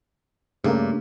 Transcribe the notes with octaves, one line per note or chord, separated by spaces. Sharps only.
G2 C#3 A3 A#3